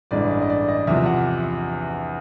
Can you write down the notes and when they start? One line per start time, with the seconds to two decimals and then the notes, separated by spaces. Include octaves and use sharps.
0.11 A1 G2 E3 G#3 D5
0.30 D#5
0.42 D#5
0.50 D5
0.69 D#5
0.87 E2 C3 F3 E5
1.06 F#5